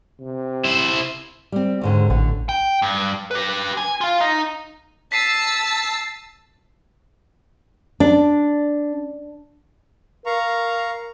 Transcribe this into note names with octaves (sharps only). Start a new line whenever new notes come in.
C3
E4 C5
G3 C4
D#2 G#2 D3
A1 D3 A3
G5
G2
G4 B4
G#5
F4 F5
D#4 D#5
A5 E6 B6 C7 D#7
D4
A#4 F5 A#5 C#6